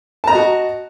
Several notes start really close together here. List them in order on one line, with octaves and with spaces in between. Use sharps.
A5 A#5 D#5 F#4